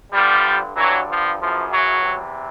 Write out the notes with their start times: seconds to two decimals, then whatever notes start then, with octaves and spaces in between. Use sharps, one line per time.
0.13 G2 D3 F3 G3
0.76 G2 D3 E3 F#3
1.08 F3
1.39 F#2 C#3 E3 F3
1.70 E3 F#3
2.02 E2 C3 E3